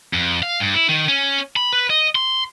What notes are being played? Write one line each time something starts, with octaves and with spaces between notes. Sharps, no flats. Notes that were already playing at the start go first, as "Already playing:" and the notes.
F2
F5
G2
E4
D#3
C#4
B5
B4
D#5
C6